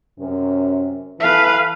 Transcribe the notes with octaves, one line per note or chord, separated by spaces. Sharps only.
F#2 C3 C#4
E3 A4 B4 F5